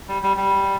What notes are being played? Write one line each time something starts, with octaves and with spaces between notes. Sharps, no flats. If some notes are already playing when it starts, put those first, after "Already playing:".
G3
G3
G3